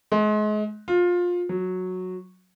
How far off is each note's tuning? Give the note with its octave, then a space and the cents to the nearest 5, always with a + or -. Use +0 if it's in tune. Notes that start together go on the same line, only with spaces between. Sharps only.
G#3 +35
F4 +20
F#3 -10